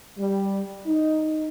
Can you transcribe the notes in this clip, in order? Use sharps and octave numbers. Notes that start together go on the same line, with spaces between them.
G3
D#4